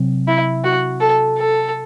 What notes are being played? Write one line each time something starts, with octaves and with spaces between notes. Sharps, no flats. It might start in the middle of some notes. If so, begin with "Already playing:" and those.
Already playing: C3 F#3 C4
E4
F#4
A4
A4